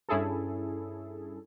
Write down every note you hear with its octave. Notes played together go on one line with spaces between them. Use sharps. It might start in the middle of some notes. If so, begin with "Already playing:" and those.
G2 C#4 E4 G#4 A4